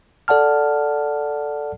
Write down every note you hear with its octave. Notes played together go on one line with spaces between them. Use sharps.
A4 D5 F#5 A5 F6